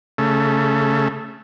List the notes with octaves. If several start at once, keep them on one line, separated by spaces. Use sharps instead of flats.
C#3 A3